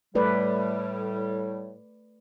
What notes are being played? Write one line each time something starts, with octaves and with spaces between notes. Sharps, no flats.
A2 G3 A3 B4 D5